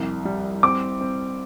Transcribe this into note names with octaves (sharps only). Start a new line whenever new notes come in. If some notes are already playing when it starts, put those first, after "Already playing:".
Already playing: C2 F2
G3
C4 D6
C4